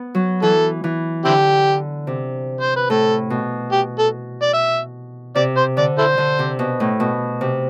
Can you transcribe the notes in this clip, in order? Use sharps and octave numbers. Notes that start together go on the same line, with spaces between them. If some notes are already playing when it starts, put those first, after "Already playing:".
Already playing: B3
F#3
E3 A4
E3
D3 C4 E4 G4
C3
C5
B4
A2 A4
B2
G4
A4
D5
E5
C3 D5
C5
D3 D5
E4 A4 C5
D3
C3
B2
A2
B2
C3